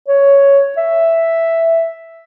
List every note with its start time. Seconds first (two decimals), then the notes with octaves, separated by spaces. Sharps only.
0.08 C#5
0.78 E5